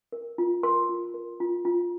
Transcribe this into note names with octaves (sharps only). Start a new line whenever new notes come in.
A#4
F4
A#4 C6
F4
A#4
F4
F4